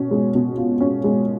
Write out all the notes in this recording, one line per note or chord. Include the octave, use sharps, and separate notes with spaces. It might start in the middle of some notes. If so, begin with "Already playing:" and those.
Already playing: B2 C#4
G#3
B2
F4
C#4
G#3